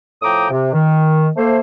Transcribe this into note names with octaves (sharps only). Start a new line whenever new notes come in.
A2 F3 G5 A#5 D6 D#6
C3
D#3
A3 A#3 C5